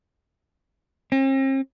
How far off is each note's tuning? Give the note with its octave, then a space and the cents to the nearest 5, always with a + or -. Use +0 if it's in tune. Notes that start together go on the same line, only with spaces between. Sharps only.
C4 +45